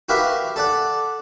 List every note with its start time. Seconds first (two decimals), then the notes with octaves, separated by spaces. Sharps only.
0.09 F#4 G4 A#4 B4 E5 F5
0.56 A4 D5 F#5